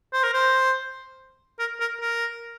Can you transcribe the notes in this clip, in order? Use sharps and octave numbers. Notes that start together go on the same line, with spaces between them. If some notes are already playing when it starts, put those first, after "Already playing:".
C5
A#4
C5
A#4
A#4
A#4